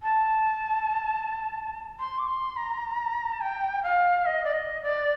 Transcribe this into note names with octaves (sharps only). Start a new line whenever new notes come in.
A5
C6
D6
C6
A#5
A5
G5
F5
D#5
D5
D#5
D5